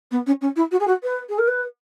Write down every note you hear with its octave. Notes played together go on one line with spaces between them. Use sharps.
B3
C#4
C#4
E4
F#4
G#4
F#4
B4
G#4
A#4
B4